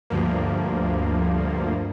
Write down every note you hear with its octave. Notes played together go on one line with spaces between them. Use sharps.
D2 G2 F3 A#3